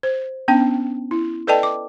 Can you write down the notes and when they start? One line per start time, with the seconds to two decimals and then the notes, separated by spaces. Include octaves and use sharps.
0.03 C5
0.48 B3 C#4 D4 G5
1.11 E4
1.47 A4 B4 D5 D#5 G5 A5
1.63 D6